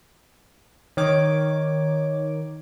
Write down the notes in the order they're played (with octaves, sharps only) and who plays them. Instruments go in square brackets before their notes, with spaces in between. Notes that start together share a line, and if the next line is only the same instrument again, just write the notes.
[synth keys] D#3 D6 [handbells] C#5